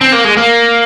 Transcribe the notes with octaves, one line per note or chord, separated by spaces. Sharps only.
C4
A#3
G#3
A#3